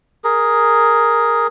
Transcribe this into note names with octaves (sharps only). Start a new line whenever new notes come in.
G#4 A#4